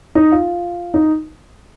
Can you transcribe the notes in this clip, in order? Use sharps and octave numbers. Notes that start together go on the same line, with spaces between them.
D#4
F4
D#4